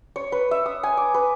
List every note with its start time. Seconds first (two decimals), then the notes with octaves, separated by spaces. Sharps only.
0.16 C#5
0.32 B4
0.51 E5
0.66 D#6
0.83 G#5
0.97 D6
1.14 B4